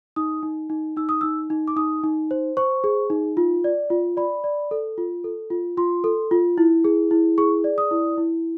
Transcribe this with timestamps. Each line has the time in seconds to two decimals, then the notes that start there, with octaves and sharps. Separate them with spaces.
0.16 D#4 D#6
0.43 D#4
0.70 D#4
0.96 D#4 E6
1.09 D#6
1.21 D#4 E6
1.50 D#4
1.68 D6
1.76 D#4 D#6
2.04 D#4
2.31 C5
2.57 C5 C#6
2.84 G#4
3.10 D#4
3.37 F4
3.64 D5
3.90 F4
4.17 D5 B5
4.44 D5
4.71 A4
4.98 F4
5.24 A4
5.50 F4
5.77 F4 C6
6.04 A4
6.31 F4
6.58 E4
6.84 G#4
7.11 E4
7.38 G#4 C#6
7.64 D5
7.78 D#6
7.91 E4
8.18 E4